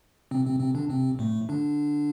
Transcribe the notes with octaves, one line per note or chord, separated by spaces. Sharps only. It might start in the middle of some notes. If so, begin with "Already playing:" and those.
C3 C4
C3 C4
C3 C4
D3 D4
C3 C4
A2 A3
D3 D4